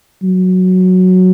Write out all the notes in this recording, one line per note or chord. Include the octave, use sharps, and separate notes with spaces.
F#3